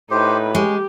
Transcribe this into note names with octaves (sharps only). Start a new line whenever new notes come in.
A2 D#4 G4 B4 C5
G#3 C#4 G4